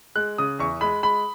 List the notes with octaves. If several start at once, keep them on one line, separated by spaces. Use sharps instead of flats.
G#3 F#6
C#3 D#6
E2 C#6
G#3 B5
G#3 B5